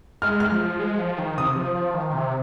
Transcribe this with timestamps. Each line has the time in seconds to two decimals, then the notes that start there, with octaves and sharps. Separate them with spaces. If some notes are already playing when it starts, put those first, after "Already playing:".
0.22 G#3 F6
0.40 F6
0.51 F3
0.79 G#3
0.98 F3
1.18 D#3
1.37 C3 D#6
1.56 F3
1.75 F3
1.94 D#3
2.10 D#3
2.13 C3